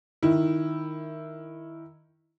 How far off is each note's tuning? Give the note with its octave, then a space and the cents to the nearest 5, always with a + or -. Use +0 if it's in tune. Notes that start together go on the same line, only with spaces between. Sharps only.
D#3 -5 E4 +0